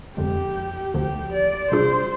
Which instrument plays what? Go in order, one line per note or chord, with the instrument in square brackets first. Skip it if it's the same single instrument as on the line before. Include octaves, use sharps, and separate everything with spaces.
[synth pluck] F2 D3 F3 G#3 [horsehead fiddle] G4
[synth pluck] D2 D3 F3 [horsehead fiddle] G4
[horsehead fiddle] D5
[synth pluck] C3 G3 D4 F4 G#4 [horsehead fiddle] C5